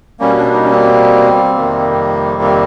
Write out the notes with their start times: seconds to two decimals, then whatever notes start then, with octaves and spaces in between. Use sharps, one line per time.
0.20 B2 G3 A#3 C#4
0.37 D4
0.53 D#4
0.64 C#4
0.71 C4
1.55 F2 C3 D#3 G3 A#3
2.41 C4